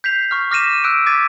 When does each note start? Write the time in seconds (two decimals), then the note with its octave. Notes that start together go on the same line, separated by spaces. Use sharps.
0.04 G6 B6 C7 F7
0.31 C#6 F6
0.51 D6 F6 A#6 B6 D#7 E7
0.84 E6 F#6 D7
1.06 D6 G#6 A6 B6 D#7